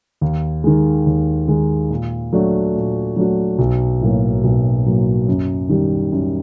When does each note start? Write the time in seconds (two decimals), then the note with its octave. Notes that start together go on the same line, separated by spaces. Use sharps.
0.21 D#2
0.64 D#3 G#3
1.06 D#2
1.48 D#3 G#3
1.90 A#2
2.33 F#3 A3 D4 F#4
2.75 A#2
3.16 F#3 A3 D4 F#4
3.59 B1
4.01 A2 F#3 A#3
4.44 B1
4.86 A2 F#3 A#3
5.28 F#2
5.69 D#3 G3
6.12 F#2